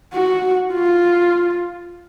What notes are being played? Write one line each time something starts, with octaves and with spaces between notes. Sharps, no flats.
F#4
F4